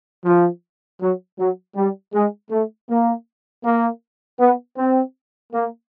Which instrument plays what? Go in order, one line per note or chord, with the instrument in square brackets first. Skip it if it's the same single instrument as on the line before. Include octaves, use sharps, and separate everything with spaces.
[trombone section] F3
F#3
F#3
G3
G#3
A3
A#3
A#3
B3
C4
A#3